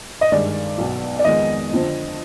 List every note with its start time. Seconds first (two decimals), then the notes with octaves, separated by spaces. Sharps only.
0.21 D#5
0.32 G2 D#3 G#3 D5
0.78 B1 B2 B3
1.19 D5
1.24 F2 D#3 G#3 B3 D#5
1.71 F2 D3 F3 C4